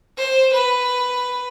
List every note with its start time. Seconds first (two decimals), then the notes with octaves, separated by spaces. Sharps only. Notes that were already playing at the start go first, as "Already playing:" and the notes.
0.18 C5
0.53 B4